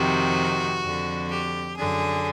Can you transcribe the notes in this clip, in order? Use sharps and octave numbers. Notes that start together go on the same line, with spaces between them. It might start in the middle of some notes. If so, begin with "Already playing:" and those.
Already playing: F2 C3 D#3 F#4
F2 D3
G4
F#2 D3 G#4